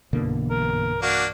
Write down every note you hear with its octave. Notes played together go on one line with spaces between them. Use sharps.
B1 G2 B2 D3 E3 A#3
A#4
A#3 D4 F#4